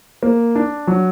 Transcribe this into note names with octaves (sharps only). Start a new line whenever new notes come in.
A#3
D4
F#3